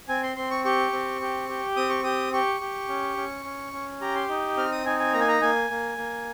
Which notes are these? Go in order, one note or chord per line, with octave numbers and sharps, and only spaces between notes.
C4 G#5
C6
C4 C6
C#6
G4 C#6
C4
G4
G4
C4 D#6
C#6
G4 D#6
G4 C#6
G4
C#4
C#4
C#4
C#4
G4 A#5
C6
D#4
C4 F6
D#6
D#4 G#5
G#5
A#3 A#5
G#5
A#5
A#3 G#5
A#3
A#3